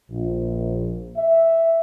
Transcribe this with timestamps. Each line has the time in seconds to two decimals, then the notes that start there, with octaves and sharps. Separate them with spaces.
0.10 A#1
1.17 E5